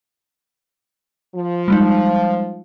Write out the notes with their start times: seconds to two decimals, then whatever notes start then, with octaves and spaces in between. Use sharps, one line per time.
1.35 F3
1.68 G3 G#3 D#4